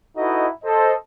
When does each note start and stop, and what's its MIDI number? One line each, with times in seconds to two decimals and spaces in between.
0.17 0.47 63
0.17 0.47 64
0.17 0.47 66
0.17 0.47 69
0.17 0.47 71
0.17 0.47 75
0.64 0.93 69
0.64 0.93 72
0.64 0.93 75